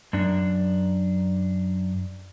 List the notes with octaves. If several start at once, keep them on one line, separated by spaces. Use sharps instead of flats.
F#2 D4